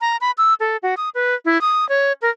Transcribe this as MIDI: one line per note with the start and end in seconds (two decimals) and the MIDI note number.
0.01 0.17 82
0.21 0.31 83
0.38 0.54 88
0.60 0.77 69
0.83 0.95 66
0.97 1.09 87
1.15 1.35 71
1.45 1.60 64
1.61 1.87 87
1.89 2.12 73
2.22 2.30 70